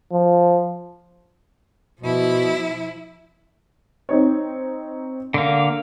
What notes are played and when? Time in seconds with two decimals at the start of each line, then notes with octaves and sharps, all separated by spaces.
0.12 F3
2.01 B2 F3 E4
4.09 C4 D#4 C#5
5.34 D3 A#3